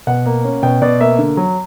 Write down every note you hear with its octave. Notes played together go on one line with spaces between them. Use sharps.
B2 F#5
A#3
C#4
B2 G5
B2 D5
A#3 E5
D3
F#3